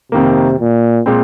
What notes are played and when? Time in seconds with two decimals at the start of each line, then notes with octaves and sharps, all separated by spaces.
0.12 F2 C3 D#3 A#3
0.59 A#2
1.06 A#2 G#3 C4